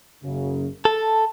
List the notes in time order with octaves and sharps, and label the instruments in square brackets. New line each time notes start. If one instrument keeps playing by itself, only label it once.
[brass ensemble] F#1 F#2 C#3
[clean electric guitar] A4 [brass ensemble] A5